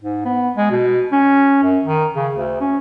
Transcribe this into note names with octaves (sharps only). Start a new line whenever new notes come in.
G#2
B3
G#3
B2
C#4
F#2
D#3
C#3
D2
C#4